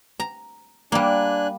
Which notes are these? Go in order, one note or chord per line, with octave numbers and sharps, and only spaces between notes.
A#5
G3 A#3 D4 G#5 F#6